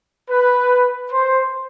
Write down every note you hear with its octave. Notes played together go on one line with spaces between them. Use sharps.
B4
C5